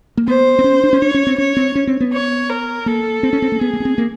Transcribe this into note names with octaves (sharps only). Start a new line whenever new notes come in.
A#3
B3 C5
C4
C#4
D4
C#4
D4 C#5
C#4
C4
C#4 C#5
C4
C#4
C4
B3
C#5
A#4
A#3 A4
C4
C#4
C4
A#3
B3 G#4
A#3
B3
C4
A#3